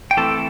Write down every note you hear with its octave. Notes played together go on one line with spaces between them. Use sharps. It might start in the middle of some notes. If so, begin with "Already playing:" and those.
G5
E3 A3 C4 A4 A5